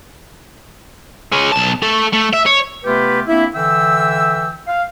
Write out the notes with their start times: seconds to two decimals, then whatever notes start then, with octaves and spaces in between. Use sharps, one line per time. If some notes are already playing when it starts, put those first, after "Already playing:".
1.32 G#3 C#4
1.52 B1 A5
1.83 A3 A4
2.13 A3
2.34 E5
2.47 C#5
2.85 C3 A3 B3 F4 G4 B4
3.28 A#3 C4 D4 E4
3.54 D3 E3 E5 G5 E6
4.67 F5